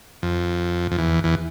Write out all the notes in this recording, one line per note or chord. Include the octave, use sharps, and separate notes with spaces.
F2
F2
E2
E2